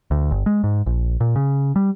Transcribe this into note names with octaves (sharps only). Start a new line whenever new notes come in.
D2
G1
G#3
G#2
A#1
A#2
C#3
G3